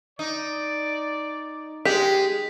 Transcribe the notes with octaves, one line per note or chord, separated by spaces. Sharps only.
D#4 D5
G#3 G4 B6